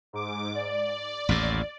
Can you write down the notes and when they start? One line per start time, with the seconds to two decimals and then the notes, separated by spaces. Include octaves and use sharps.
0.13 G#2 D6
0.55 D5
1.29 A1 D#2 A2